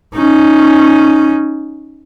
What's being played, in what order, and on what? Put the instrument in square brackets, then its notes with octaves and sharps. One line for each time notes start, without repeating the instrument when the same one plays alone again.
[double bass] C#4 D#4